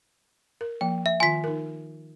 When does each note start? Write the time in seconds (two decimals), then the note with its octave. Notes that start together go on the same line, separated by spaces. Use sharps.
0.61 A#4
0.81 F3 A#3 G5
1.06 E5
1.20 D#3 F4 G#5 C6 B6
1.44 D#4 A#4